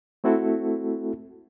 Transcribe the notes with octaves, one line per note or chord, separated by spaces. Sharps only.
A3 C4 E4 F#4 A4